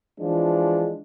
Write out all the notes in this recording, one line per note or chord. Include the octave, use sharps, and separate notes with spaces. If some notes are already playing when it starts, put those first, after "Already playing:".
E3 F3 G#3 D4